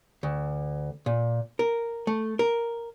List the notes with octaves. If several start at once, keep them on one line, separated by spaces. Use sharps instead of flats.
D2
A#2
A#4
A3
A#4